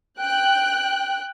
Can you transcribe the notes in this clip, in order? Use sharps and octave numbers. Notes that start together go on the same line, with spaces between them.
G5 F#6